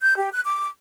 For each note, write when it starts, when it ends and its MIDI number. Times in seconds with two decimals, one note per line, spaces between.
0.02 0.17 91
0.19 0.30 67
0.32 0.41 90
0.44 0.67 86